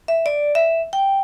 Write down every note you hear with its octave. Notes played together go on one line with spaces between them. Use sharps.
E5
D5
E5
G5